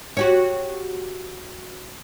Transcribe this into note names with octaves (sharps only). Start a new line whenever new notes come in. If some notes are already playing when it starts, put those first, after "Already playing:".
F#4 G4 C#5